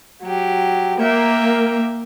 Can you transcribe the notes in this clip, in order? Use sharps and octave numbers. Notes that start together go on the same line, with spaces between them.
F#3 G4
A#3 E5 G5